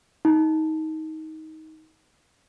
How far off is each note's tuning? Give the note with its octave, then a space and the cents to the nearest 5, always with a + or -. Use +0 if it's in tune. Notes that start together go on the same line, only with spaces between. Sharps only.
D#4 +20